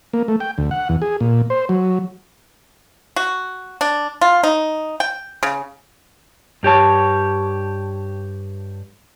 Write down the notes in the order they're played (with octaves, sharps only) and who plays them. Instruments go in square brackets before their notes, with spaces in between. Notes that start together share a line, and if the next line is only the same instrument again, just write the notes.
[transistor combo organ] A#3
A3
G5
D2
F#5
E2
G#4
A#2
C5
F#3
[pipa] F#4
D4
F4
D#4
G5
C#3
[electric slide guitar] G2 G4 C#5 A5